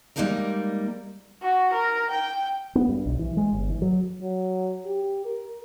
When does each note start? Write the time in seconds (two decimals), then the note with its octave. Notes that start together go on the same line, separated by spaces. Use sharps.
0.16 G3 G#3 A#3 D#4 G#4 A#4
1.42 F#4
1.72 A#4
2.10 G5
2.75 B3
2.89 G2
3.06 B1
3.19 E3
3.37 G#3
3.53 G1
3.70 E3
3.82 F#3
4.22 F#3
4.86 G4
5.25 A#4